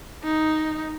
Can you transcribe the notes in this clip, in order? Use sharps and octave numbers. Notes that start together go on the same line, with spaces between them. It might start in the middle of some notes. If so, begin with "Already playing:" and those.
D#4